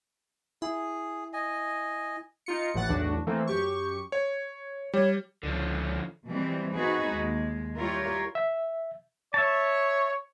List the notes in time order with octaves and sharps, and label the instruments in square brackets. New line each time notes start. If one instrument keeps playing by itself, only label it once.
[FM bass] E4 [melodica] G#4
[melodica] D#5 G#5
[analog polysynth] D#4 F4 C#7
A1 A2 E3 F#5 F#6 A6
B1 E2 A2 D4 F#4
E3 A3 A#3 C4
F#2 G4 C#6
[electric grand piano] C#5
[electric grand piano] G3 [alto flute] C#5
[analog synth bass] C#2 [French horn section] A#2 C#4 A4 [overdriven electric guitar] D3 F3
[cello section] B2 E3 G3 G#3 C4
B3 C4 D#4 F#4 G#4 B4
D#2 G#3
G3 E4 F4 G4 A#4 C#5
[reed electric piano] E5
[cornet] C#5 [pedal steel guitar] E5 A5